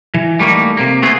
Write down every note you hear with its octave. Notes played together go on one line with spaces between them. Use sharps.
E3
G3 A3 A#3 D#4
C3 A#3
A3 B3 F4 G#4